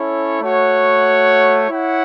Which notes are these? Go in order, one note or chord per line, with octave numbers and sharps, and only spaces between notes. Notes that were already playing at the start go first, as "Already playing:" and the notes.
Already playing: C#4 E4 A4 C#5
A3 F#4 C#5 F#5
E4 C#5 F#5